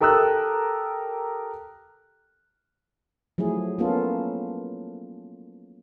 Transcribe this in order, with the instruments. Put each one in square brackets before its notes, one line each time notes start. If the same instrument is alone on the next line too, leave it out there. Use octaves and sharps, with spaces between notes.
[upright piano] G4 A4 A#4 D#6 E6 F#6
[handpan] F3 F#3 A3 E4 G#4
A#3 B3 C#4 F4 A4